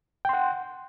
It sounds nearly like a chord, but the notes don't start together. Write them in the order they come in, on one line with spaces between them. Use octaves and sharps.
G5 C6 F#5